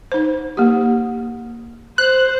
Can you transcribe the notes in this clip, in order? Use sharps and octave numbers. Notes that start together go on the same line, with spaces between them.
D#4 C5
A#3 G4
C5 F#6